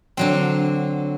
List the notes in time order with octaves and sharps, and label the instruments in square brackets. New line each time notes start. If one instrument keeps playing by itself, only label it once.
[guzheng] D3 F#3 C4